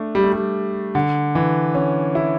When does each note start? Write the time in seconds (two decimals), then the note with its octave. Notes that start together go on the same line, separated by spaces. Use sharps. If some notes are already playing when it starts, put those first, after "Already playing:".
Already playing: A3 D4
0.15 G3
0.24 A3
0.33 G3
0.95 D3
1.35 E3
1.75 C#4
2.15 E4